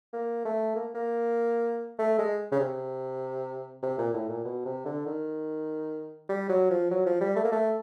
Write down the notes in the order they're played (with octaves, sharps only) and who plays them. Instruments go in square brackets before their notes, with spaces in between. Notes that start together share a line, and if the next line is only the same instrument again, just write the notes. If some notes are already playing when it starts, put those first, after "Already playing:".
[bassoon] A#3
A3
A#3
A#3
A3
G#3
C#3
C3
C3
A#2
A2
A#2
B2
C3
D3
D#3
G3
F#3
F3
F#3
F3
G3
A3
A#3
A3